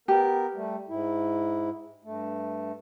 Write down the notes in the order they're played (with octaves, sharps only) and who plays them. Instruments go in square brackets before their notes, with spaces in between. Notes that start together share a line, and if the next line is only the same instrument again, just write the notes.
[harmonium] B3 A#4 [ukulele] G4
[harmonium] G3 A3
G#2 E4
G2 A3